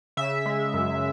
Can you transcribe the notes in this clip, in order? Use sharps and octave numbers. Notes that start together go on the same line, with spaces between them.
C#3 E5
G#3
F#2